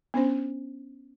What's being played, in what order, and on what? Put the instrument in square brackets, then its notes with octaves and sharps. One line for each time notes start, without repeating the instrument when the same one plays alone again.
[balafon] B3 C#4 D4 C5